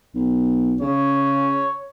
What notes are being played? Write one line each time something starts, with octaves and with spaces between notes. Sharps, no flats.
B1
C#3 C#5